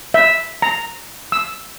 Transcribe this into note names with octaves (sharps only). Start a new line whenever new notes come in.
E5
A#5
E6